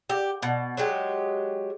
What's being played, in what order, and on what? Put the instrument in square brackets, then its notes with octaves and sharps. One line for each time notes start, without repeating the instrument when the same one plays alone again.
[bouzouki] G4
B2
F#3 G#3 G4